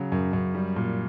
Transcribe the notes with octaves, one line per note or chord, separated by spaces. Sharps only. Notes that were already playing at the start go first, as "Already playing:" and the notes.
Already playing: C#3 F#3
F#2
F#2
G3
A#2